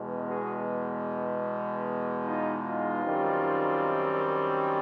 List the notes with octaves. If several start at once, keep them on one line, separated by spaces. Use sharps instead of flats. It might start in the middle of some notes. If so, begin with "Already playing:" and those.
Already playing: E2 B2 G#3
F#4 G#4
D#4 F4
D#4 F4
F#2 D#3 G3 C4